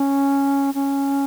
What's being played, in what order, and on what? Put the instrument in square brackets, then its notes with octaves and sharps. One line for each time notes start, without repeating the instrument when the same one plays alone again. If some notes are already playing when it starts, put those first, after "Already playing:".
Already playing: [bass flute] C#4
C#4